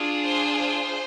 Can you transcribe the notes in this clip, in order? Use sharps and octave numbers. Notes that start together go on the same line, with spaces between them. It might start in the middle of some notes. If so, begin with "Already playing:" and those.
Already playing: D4 F4 G#4
C5
C5